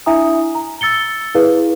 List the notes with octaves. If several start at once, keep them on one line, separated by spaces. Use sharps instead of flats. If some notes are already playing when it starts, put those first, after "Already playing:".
D4 E4 E5 G#5 A#5 D#6
A#5
E6 A6 C#7 G7
E4 G#4 B4 F5